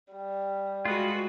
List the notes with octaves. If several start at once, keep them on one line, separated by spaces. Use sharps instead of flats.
G3
G#3 F4 F#4 B4